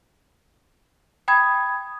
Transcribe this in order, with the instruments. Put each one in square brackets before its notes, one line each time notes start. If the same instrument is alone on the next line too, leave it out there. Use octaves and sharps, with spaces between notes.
[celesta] G5 B5 D#6 G#6